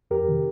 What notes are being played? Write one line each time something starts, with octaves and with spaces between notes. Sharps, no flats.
F2 G4 A#4
C3 D#3